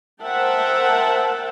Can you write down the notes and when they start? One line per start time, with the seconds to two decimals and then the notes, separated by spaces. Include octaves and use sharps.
0.21 A#4 C5 E5 F#5 G5 A5